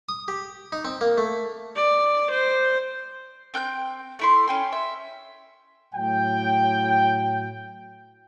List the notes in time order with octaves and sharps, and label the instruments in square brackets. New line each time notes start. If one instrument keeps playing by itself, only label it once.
[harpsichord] D#6
G4
D#4
C4
A#3
A3
[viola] D5
C5
[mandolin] C4 G5 F#6 G6
A3 E4 C6
C#4 G5 C6
E5
[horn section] A2 F#3 G5